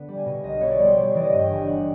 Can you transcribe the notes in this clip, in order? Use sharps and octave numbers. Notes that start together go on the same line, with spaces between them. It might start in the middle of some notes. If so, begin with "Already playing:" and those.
Already playing: D3 B3
G3
G#5
B2
B1 D#5
B3 C#5
D5
G3
C5
G3 C#5
E3 D5
D#5
G2
G5
G1 G#5
G3 F#5
G5